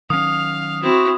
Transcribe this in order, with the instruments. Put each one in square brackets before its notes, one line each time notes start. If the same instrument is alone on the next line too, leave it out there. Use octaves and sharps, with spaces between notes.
[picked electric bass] D#3 F#3 C#4 [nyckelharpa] F5 [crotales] D#6
[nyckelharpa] C4 E4 [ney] F#4